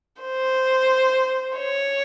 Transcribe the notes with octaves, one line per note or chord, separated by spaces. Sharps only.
C5
C#5